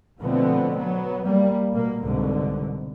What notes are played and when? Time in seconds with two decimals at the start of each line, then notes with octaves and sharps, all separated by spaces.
0.21 B2 D3 F3 A3 B3 C4
0.76 F#3 B3
1.25 G3 A#3
1.74 B2 A#3
2.03 C2 G#2 B2 D3